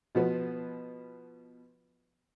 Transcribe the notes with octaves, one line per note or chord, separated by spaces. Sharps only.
B2 F3 B3